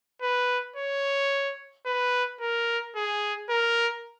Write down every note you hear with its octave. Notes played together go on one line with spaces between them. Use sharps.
B4
C#5
B4
A#4
G#4
A#4